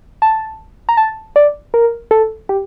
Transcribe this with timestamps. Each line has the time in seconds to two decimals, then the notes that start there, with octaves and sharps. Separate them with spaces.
0.22 A5
0.89 A#5
0.97 A5
1.36 D5
1.74 A#4
2.11 A4
2.49 G4